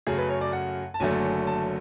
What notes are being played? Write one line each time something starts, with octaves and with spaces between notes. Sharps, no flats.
F#2 C#3 F#3 A3 G#4
B4
C#5
D5
F#5
A5
F#1 F#2 D3 F#3 A3 G#5
A5